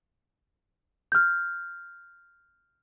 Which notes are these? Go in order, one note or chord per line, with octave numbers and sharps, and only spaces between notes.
F6 G6